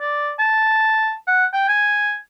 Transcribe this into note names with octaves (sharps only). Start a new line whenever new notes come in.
D5
A5
F#5
G5
G#5